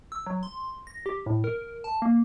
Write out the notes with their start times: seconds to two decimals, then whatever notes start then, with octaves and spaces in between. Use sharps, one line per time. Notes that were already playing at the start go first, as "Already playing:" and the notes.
0.12 E6
0.26 F#3
0.43 C6
0.87 A#6
1.06 G4
1.26 A2
1.44 A#4
1.84 A5
2.02 A#3